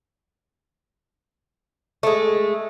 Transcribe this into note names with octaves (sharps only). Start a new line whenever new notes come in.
G#3 A3